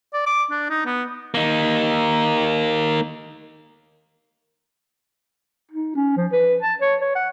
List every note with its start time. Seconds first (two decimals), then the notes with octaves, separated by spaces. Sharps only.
0.14 D5
0.26 D6
0.51 D4
0.70 D#4
0.86 B3
1.34 A#3 D#4
5.71 D#4
5.96 C#4
6.16 F3
6.32 B4
6.62 A5
6.81 C#5
7.01 C#5
7.15 F#5